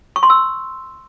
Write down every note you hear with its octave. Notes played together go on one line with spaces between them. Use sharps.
C#6
C6
E6